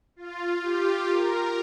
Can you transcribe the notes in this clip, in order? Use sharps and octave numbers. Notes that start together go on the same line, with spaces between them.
F4
G4
A#4